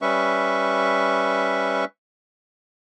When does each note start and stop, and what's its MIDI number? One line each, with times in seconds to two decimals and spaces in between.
0.02 1.85 55
0.02 1.85 61
0.02 1.85 71
0.02 1.85 76
0.02 1.85 85